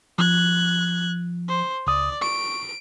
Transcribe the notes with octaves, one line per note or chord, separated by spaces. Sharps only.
F3 F#6 G#6
C5
C#2 D5 D#6
C#6 D7